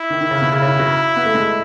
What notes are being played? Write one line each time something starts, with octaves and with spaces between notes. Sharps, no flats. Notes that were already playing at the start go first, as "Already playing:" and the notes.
Already playing: E4
D#3
D#3
C#3
B2
C#3 E4
C#3
D#3
F#3
B3
A3
G#3